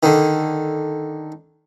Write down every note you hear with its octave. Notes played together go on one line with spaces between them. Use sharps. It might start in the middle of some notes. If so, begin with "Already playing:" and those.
D3 D#3